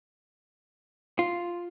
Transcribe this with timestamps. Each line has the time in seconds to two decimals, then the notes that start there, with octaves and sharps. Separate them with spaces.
1.19 F4